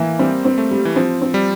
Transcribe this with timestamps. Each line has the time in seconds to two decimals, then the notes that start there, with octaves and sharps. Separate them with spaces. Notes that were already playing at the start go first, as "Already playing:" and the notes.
Already playing: E3 A#3
0.19 G3 C4
0.45 C4
0.58 A3
0.71 G3
0.85 E3
0.96 F3 C4
1.22 C4
1.34 G3